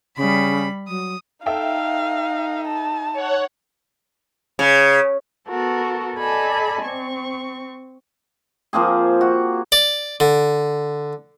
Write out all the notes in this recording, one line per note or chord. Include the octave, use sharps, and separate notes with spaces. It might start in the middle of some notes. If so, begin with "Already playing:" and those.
C#3 G3 B5
F#3 D#6
D#4 A4 E5 F5 G5
A5
C#5 F#5
C#3
B3 F#4 A4 A#4
A4 D5 D#5 G#5 A5 B5
C4 C#6
F3 A#3 C4 G#4
F#4
D5
D3